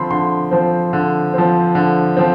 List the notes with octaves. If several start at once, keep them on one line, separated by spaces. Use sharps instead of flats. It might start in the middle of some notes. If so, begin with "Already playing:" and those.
Already playing: D3 F3 C4 B5 C6
D3 C6
F3 C4
D3
F3 C4
D3
F3 C4